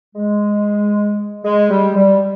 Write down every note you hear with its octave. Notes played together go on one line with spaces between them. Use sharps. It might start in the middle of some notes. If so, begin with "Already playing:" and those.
G#3
G#3
G3
G3